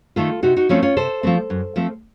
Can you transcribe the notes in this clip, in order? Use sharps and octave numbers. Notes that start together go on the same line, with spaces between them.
D#3 A3 F4 A4
C3 D#4 F#4
D#4 F#4
F3 A3 C4 C#4 F4
C#4 F4
C3 A4 C5
F3 A3 C4
F#2
F3 A3 C4